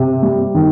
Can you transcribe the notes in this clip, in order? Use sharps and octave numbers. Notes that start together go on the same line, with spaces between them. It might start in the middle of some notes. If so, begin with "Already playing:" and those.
Already playing: C3
G3
D#3